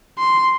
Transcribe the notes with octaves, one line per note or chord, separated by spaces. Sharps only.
C6